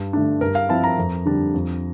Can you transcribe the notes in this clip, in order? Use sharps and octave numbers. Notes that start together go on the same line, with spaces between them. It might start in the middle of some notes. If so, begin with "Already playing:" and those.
Already playing: G2
D3 A3 D4
G2 A#4
F5
F3 C4 E4 A5
A#5
F2
D3 G3 D4
F2